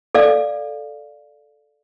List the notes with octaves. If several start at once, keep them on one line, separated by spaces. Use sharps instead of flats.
A4 D5 F5